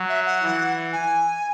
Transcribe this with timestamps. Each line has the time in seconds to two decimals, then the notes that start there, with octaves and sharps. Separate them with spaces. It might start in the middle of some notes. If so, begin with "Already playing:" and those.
Already playing: F#3
0.09 E5
0.26 F#5
0.42 E3
0.93 G#5